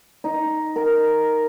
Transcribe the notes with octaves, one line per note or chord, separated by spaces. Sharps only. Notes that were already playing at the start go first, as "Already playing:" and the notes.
D#4
A#4